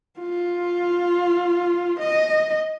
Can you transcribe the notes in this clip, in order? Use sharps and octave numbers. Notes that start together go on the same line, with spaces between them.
F4
D#5